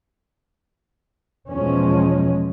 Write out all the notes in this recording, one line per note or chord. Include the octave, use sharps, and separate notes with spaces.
E2 B2 F3 G#3 C#4